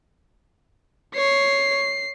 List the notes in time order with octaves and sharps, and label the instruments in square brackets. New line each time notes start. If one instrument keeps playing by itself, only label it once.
[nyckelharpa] C#5 [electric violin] C7